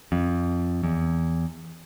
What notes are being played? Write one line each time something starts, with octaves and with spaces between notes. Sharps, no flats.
F2
E2